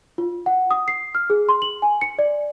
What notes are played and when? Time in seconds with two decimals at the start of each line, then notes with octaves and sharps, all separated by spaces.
0.18 F4
0.46 F#5
0.71 D#6
0.88 C7
1.15 F6
1.30 G#4
1.49 C6
1.62 F#7
1.82 G#5
2.01 C#7
2.19 D5